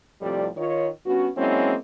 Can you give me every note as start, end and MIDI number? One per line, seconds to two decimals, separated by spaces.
0.22 0.48 41
0.22 0.48 45
0.22 0.48 48
0.22 0.48 53
0.22 0.48 55
0.22 0.48 74
0.57 0.88 51
0.57 0.88 65
0.57 0.88 73
1.06 1.28 43
1.06 1.28 59
1.06 1.28 61
1.06 1.28 66
1.37 1.75 54
1.37 1.75 56
1.37 1.75 58
1.37 1.75 60
1.37 1.75 61
1.37 1.75 64